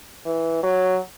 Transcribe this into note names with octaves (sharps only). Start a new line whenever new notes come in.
E3
F#3